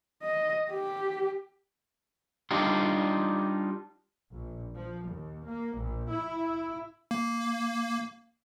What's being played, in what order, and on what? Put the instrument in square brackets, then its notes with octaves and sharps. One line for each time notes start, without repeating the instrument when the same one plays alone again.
[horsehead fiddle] D#5
G4
[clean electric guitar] G3 D4 D#4 F4 G4
[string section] A#1
F3
D#2
A#3
A#1
E4
[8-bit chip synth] A#3